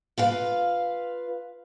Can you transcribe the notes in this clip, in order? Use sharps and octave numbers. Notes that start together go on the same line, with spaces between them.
F4 B4 F5